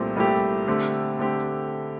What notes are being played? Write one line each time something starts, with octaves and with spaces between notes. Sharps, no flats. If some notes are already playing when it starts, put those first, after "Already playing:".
Already playing: C2 A#2 A3 C4 G4
C2 A#2 A3 C4 G4
D3 A3 C4 G4
D3 A3 C4 G4